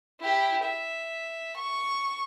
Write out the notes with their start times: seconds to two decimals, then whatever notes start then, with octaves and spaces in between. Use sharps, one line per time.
0.20 E4 G4
0.63 E5
1.56 C#6